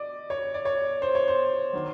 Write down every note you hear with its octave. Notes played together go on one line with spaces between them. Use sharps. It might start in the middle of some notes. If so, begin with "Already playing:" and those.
Already playing: D5 D#5
C#5
D5
C#5
C5
C#5
C5
D#3 F#3